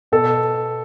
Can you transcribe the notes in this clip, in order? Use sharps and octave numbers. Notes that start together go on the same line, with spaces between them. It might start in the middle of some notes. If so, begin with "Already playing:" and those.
B2 A4